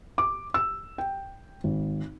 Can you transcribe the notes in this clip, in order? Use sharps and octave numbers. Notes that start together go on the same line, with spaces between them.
D6
E6
G5
G#1